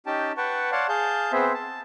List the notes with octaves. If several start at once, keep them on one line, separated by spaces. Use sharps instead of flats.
C#4 D#4 G4 G5 A5
B4 F#5 G5 A5 C#6
C#5 D5 F5 F#5 A5 C6
G#4 F5 A5 G6
B3 C4 G#4 C5 E5
A5